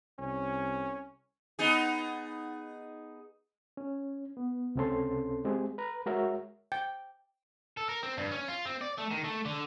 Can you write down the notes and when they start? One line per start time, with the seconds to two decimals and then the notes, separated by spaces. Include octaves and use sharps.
0.19 C2 C#4
1.59 B3 D#4 G#4
3.77 C#4
4.37 B3
4.75 C#2 C3 C4 C#4 A4 C6
5.45 G#3 C4 G4 G#4
5.78 B4 A#5
6.06 G#3 F#4 A#4 C#5 E5
6.72 G5
7.77 A4
7.89 A#4
8.03 C4
8.17 G2
8.31 C#4
8.48 F4
8.65 C4
8.81 D5
8.98 A3
9.11 D#3
9.24 A3
9.45 D3